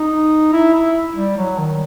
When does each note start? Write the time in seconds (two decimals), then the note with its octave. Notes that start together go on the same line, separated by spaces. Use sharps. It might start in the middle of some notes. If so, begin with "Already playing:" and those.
Already playing: D#4
0.53 E4
0.74 E4
1.16 G3
1.37 F#3
1.58 D#3